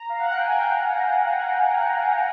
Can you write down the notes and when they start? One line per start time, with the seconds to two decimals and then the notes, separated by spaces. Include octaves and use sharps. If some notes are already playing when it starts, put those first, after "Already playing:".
Already playing: A#5
0.09 F5
0.19 F#5
0.29 G5
0.39 G#5
0.55 G5